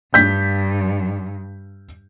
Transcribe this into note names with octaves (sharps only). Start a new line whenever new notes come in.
G2 G6 B6